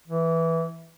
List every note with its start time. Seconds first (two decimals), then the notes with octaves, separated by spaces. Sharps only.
0.08 E3